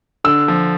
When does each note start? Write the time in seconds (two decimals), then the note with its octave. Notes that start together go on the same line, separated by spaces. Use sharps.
0.24 D3 E6
0.48 F3